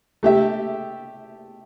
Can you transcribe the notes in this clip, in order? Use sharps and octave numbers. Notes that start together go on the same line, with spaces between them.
A3 G4 E5